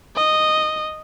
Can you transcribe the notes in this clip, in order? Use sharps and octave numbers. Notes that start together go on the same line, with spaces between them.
D#5